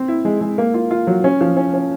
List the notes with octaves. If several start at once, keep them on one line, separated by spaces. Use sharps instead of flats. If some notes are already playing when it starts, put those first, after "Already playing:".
Already playing: C4
E4
G#3
G#3
A#3
F4
F4
F#3
C#4
F3
C#4
C#4